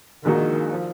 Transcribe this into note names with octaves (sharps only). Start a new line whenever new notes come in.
A#1 A#2 D#3 G#3 D#4 F#4
F3